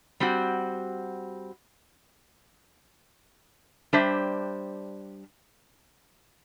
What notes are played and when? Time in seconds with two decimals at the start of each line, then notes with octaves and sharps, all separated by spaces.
0.20 G3 C4 F#4
3.93 G3 D4 G4 C5 E5